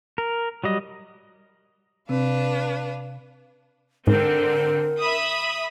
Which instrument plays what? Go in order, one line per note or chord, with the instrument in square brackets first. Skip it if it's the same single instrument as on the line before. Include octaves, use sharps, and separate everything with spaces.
[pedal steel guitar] A#4
F#3 G3 D#5
[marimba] C3 C4 [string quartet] D4 B4 F5
[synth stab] G#2 [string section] D3 C4 [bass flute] A#4
[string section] E5 B5 D#6